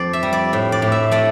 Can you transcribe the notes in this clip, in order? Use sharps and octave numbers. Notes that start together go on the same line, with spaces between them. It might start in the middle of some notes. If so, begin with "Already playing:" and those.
Already playing: F2 C5 D5
E5
G3
D5
A2
D5
A2
E5
A3 D5